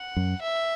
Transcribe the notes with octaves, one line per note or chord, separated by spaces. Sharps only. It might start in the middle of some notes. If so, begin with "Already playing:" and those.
Already playing: F#5
F#2
E5